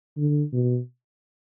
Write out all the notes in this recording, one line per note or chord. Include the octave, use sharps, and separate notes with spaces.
D3
B2